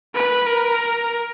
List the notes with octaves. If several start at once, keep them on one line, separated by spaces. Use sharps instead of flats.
B4
A#4